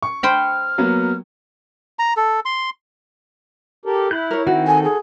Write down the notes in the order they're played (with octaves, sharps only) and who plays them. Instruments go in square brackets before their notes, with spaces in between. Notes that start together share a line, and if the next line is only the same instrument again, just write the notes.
[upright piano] C#6
[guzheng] C5 G5 B5 [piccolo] F6
[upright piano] F#3 A#3 B3
[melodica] A#5
A4
C6
[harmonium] G4 A4 A#4
[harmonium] E4 [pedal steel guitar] B5 F#6 G6
[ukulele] A#4 C#5
[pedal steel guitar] D#3 C4 D#4 [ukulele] F#4
[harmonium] A4 [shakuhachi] G#5
[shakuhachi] G#4